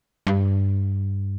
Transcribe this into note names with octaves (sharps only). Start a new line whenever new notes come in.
G2